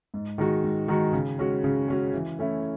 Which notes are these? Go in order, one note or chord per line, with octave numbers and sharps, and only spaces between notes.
G#2
D#3 G#3 D#4 F#4
G#2
D#3 G#3 D#4 F#4
C#3
G#3 C#4 F#4
C#3
G#3 C#4 F#4
E3
A3 C#4 E4